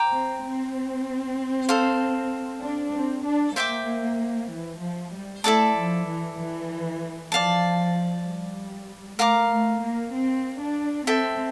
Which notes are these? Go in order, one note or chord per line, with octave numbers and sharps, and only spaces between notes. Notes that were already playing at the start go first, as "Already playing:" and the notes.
Already playing: C5 G5 A#5 D6
C4
C4
A4 C5 F5
D4
C4
D4
A#3 C5 E5 G5 D6
E3
F3
G3
A3 E4 A4 D5 A5
F3
E3
E3
F3 D5 F5 A5
G3
A3 A#4 F5 A#5 D6
A3
A#3
C4
D4
C4 A4 E5 G5